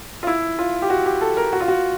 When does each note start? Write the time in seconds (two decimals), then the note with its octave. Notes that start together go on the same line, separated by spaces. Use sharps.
0.23 F4
0.27 E4
0.59 F4
0.82 G4
0.90 F#4
1.06 G4
1.21 A4
1.37 A#4
1.53 F#4
1.60 F4
1.68 F#4